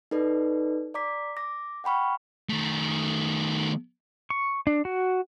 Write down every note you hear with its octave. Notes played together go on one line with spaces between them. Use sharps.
D#4 A4 B4 D5
D5 A#5 D6 B6
D6 A#6
F#5 G5 B5 C#6 F6
D#3 A3
C#6
D4
F#4